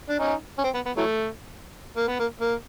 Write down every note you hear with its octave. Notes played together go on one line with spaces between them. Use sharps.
D4
C#4 D#4
C#4
C4
B3
B3
E3 F#3 A3
A#3
B3
A#3
A#3